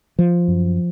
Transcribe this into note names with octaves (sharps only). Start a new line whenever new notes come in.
F3
F#2